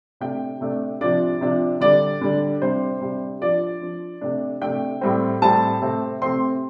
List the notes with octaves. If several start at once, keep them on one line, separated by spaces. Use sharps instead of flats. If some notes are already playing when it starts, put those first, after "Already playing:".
C3 A3 D4 G5
C3 A3 D4
C3 F3 D4 D5
C3 F3 D4
D3 G3 D4 D5
D3 G3 D4
C3 G3 D4 C5
C3 G3 D4
F3 D4 D5
F3 D4
C3 A3 D4
C3 A3 D4 G5
A2 G3 C4
A2 G3 C4 A5
C3 A3 C4
C3 A3 C4 C6